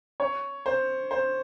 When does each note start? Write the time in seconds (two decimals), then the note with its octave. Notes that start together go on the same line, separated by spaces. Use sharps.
0.20 C#5
0.66 C5
1.11 C5